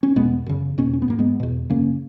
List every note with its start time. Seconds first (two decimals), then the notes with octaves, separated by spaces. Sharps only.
0.03 C#4
0.16 E2 B2 G#3 B3
0.46 F#2 C#3
0.78 E2 B2 A#3 C#4
0.93 C#4
1.02 B3
1.08 G#2 A#3
1.19 G#3 B3
1.40 E2 B2
1.70 F#2 C#3 A#3 C#4